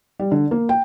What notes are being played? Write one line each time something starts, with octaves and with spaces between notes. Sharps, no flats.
G3
D3
A#3
G5